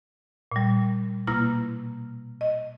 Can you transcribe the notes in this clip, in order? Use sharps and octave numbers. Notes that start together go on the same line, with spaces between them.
A#2 G3
B2 A#3 E4 F6 A#6
D#5